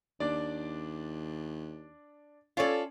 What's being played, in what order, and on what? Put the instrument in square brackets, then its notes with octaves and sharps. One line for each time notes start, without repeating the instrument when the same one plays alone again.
[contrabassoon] D#2 [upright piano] D4 D5
[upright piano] C#4 C#5 D5 [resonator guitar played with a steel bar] F4 A4